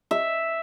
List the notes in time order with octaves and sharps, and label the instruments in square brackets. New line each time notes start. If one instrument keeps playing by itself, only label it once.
[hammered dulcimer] E5